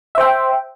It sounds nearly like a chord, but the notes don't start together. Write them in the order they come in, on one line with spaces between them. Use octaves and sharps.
E5 C5 G5